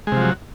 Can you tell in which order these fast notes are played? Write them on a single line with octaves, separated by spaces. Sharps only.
G#3 C3 F3 F#3